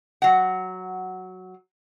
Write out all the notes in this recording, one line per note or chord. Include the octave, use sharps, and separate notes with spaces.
F#3 F#5